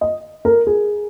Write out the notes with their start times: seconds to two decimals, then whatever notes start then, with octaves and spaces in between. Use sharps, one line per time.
0.01 D#5
0.45 A#4
0.67 G#4